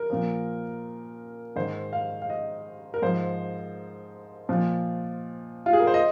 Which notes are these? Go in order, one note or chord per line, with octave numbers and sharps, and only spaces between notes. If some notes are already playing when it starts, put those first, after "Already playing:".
Already playing: A#4
A#2 F3
G#2 D#3 C5
F5
F5
D#5
A#4
G#2 F3 C5
A#2 F3
F4
G#4
A#4
C5
D#5